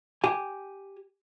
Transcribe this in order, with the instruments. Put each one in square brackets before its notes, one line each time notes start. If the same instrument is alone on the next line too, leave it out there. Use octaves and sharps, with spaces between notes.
[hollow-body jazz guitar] G4 G#5